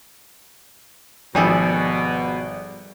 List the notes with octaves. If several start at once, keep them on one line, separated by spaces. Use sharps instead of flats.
G#1 B2 F3 G3 G#4 A4